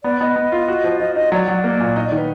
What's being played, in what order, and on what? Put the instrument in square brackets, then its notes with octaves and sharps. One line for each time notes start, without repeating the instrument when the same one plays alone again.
[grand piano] B3 [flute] D5
[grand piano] B3 [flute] D#5
[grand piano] B3
F4
F#4
F3
[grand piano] F3 [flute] D#5
[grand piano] D#4 [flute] D#5
[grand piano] F#3 [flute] D5
[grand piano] F#3
A#3
A#2
[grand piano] D#4 [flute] D#5
[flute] D5
[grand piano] D#3
[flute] B4